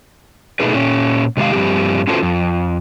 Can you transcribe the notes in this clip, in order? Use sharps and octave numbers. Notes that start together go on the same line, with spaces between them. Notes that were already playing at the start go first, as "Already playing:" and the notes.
B2 G#3 A3 D#4 G#4 B4
A#2 C#4
C3 D#3 G#3 G4 F5
G2 F3 G3 C4 G4
C#4 F4 F#4 A4 B4 C5
F2